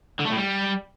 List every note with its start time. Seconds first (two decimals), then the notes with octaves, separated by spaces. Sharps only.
0.19 D3
0.25 A3
0.31 A2
0.37 G3